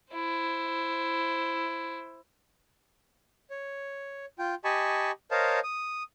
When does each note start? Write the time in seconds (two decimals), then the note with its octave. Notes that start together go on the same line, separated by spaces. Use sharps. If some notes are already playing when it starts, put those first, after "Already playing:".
0.13 E4 C5
3.50 C#5
4.39 F4 G5
4.64 G4 D#5 G#5 A5 B5 C#6
5.31 A#4 C5 C#5 D#5 F5 A5
5.64 D#6